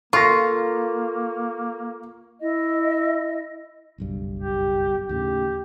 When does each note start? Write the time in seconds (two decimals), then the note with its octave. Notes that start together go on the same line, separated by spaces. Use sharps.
0.13 A#3 F4 A4 A#4 C#6 A#6
2.40 E4 D#5
3.98 F#1 B1 G2
4.39 G4
5.09 D#2 A2 C#3 G4